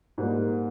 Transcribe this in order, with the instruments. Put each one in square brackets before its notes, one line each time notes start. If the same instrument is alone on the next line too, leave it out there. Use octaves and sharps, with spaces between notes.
[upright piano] G#2 G3 A#3